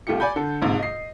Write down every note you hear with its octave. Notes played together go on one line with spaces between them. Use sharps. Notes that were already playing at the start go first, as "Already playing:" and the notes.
C2 A3 F4 G4 C#7
D5 G#5 B5 G6
D3 A4
A#1 G#2 C3
D#5 C7